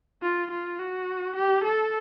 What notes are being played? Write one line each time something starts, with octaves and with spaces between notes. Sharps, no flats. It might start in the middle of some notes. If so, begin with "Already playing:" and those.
F4
F4
F#4
G4
A4